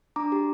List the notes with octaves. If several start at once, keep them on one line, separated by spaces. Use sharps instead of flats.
D4 A#5 D6
G4